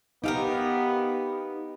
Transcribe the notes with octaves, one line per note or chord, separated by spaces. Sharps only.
B3 D#4 G4 A4 A#4 F5